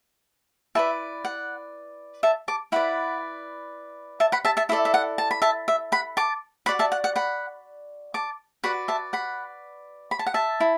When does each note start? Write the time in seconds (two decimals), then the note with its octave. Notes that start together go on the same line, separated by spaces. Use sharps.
0.75 E4 B4 D5 E5 A5
1.25 F#5
2.23 E5 A5
2.48 A5 D6
2.72 E4 B4 D5 F#5 B5
4.20 E5 A5
4.32 F#5 B5
4.45 E5 A5
4.57 E5 A5
4.69 E4 A4 D5 E5
4.85 E5
4.94 F#5
5.18 A5
5.31 B5
5.42 E5 A5
5.68 E5
5.92 F#5 B5
6.17 A5 D6
6.66 F#4 D5 F#5 B5
6.79 E5 A5
6.92 F#5
7.04 F#5
7.16 F#5 B5
8.14 A5 D6
8.64 F#4 B4 D5 F#5 B5
8.88 E5 A5
9.13 F#5 B5
10.11 B5
10.19 A5
10.26 F#5
10.34 E5 A5
10.60 E4